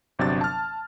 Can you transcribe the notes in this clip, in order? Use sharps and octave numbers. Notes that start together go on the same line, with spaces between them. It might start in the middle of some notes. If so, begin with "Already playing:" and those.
G1 C3 F#3 D4 A6
A5 F6